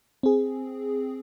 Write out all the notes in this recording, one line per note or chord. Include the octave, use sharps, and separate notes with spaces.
C4 G#4